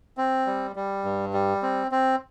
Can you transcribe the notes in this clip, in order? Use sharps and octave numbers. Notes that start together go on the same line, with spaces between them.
C4
G3
G3
G2
G3
C4
C4